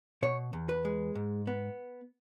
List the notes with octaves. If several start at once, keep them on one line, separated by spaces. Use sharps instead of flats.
B2 C#5
E2
B4
G#3
G#2
B3